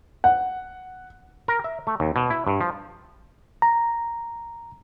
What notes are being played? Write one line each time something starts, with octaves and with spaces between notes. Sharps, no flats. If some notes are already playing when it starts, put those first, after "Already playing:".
F#5
A#4
E5
A3
D#2
B2
E4
G2
F3
A#5